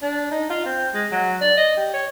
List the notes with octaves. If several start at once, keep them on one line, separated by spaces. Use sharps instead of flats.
D4
D#4
F4
C4
G#3
F#3
D5
D#5
G4
C#5